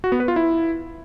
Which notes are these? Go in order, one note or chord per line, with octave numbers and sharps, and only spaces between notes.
F#4
B3
B4
F4
E4